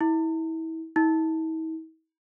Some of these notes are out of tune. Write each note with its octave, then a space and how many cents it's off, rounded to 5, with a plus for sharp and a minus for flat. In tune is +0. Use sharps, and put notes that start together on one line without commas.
E4 -30
E4 -45